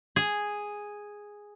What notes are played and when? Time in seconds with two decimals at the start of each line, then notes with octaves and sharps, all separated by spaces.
0.16 G#4